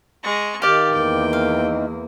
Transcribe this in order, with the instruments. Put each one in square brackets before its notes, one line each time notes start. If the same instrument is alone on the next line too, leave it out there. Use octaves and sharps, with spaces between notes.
[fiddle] G#3 C#6
[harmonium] D#3 [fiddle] G4 [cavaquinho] D5 F5
[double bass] E2 A#3 [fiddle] G5
[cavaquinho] F5